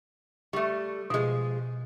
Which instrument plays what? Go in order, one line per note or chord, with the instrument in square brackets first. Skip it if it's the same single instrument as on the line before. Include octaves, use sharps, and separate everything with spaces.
[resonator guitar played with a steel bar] G3 A3 [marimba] C#6
[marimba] B2 [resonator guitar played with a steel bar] F3 G#3